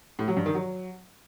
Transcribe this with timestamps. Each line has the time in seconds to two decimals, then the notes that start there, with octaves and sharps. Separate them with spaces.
0.19 A2
0.28 F#3
0.37 G2
0.46 D#3
0.55 F#3